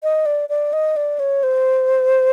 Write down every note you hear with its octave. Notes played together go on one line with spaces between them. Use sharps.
D#5
D5
D5
D#5
D5
C#5
C5